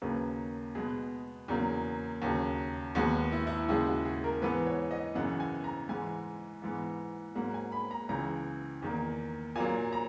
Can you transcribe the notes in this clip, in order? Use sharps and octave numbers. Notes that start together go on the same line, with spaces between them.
D#2 C#3 F#3 A#3 B4
B2 G#3 B3 G#4
E2 C#3 F#3 A#3
D#2 C#3 F#3
D#2 D#3 G#3 B3 F#4
E4
E4
D#2 C#3 G#3 E4
F#4
G#4
A#4
G#2 E3 B3 B4
C#5
D#5
F#2 C#3 E3 F#5
G#5
A#5
G#2 E3 G#3 G#5
G#2 E3 B3
G#2 F#3 A#3 F#5
G#5
B5
A#5
C#2 C#3 E3 A#5
E2 D#3 A#3
A#2 F#3 A#3 G#5
A#5